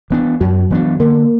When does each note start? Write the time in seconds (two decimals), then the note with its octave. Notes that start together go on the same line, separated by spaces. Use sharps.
0.10 E3 B3 D4
0.40 F#2 F#3
0.70 E3 B3 D4
0.99 D3 A#3